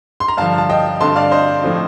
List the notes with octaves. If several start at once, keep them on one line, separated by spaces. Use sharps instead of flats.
C6
A#5
G2 D3 F3 F5 A5
A5
D#5 G5
G2 D3 A3 C4 A5 C6
D5 F5
C5 D#5
A2 F3 A3 C4 D#4